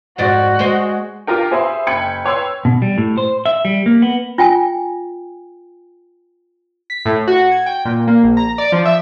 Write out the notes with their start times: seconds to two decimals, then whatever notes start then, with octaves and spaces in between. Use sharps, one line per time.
0.18 F2 G#2 F#4 D5
0.59 G#3 C5
1.27 F4 G4 A#4 G5
1.51 G#4 C5 E5 B5 C6
1.87 F#1 G5 B5 G#6 C#7
2.25 B4 C#5 G5 C6 E6
2.65 B2
2.82 G3
2.98 A2
3.18 C5
3.46 E5
3.65 G3
3.86 A#3
4.02 B3
4.38 F4 G5 G#5
6.90 B6
7.06 A2
7.28 F#4
7.51 G#6
7.66 G5
7.85 A#2
8.07 A#3
8.24 A#1
8.37 A#5
8.58 D5
8.72 F3
8.85 E5